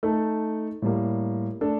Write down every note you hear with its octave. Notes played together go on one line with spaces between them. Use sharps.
A3 D#4 A4
A2 G3 A#3
A3 D4 A4